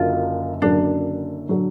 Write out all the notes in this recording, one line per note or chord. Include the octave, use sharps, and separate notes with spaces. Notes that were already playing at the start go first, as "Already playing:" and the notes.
Already playing: F#1 F#2 D3 F#3 F4
F#1 F#2 D3 F#3 D4
D3 F#3